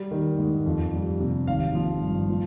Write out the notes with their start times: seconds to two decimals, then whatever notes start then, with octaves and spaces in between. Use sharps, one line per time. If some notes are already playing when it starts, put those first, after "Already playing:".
Already playing: G3
0.11 D#3
0.38 G#2
0.66 F2
0.93 G3
1.20 C3
1.47 G#1 F5
1.75 F3
2.01 G2
2.29 F3